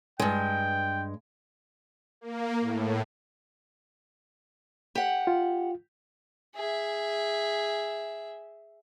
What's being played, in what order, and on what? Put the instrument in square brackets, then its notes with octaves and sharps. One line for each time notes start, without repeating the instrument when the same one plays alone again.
[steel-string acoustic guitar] G2 G#3 [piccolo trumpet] G5
[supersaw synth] A#3
A2
[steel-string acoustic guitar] G4 F#5
[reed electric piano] F4
[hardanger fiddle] G#4 E5